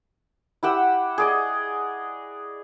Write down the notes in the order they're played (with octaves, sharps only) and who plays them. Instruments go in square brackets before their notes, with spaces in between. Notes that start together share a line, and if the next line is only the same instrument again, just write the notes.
[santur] E4 G4 F#5 E6
G#4 D5 D#5